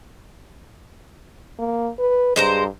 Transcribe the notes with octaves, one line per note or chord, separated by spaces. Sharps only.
A#3
B4
G2 G#3 C5 A#5